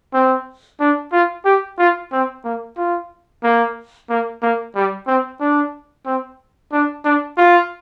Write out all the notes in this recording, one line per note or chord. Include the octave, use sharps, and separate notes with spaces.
C4
D4
F4
G4
F4
C4
A#3
F4
A#3
A#3
A#3
G3
C4
D4
C4
D4
D4
F4